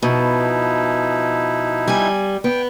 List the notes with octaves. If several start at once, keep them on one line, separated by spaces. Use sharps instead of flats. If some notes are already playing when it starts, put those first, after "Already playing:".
B2 F3 D#4 E4
G3 G#5
B3 G5